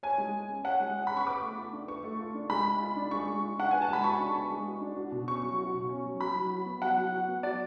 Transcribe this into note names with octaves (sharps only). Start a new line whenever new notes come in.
C#5 G#5
G#3
G#4
C#4
C#5 F#5
G#3
G#4
C#4 B5
C#6
B4 D6
A3
F4
D4
B4 C#6
A3
F4
D4
G#3 B5
G#3
F4
D4
G#3 C#6
G#3
F4
D4 F#5
B4 G#5
A5
G#3 B5
F#4 C#6
D4
B4
G#3
F#4
D4
F#4
B2
C#4 C#6
F#3
F#4
B2
C#4
F#3
F#3 B5
F#3
F#4
B3
F#3 F#5
F#3
F#4
B3
F#3 D5